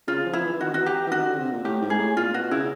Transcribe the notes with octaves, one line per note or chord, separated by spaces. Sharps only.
C#3 F4
F3
E4
E3
E3
D#3 F#4
E3 F#4
G4
E3
D#3 F#4
D3
C3
A#2
A2 G4
G#2
G#4
A2
A#2 F4
B2 F#4
C#3 E4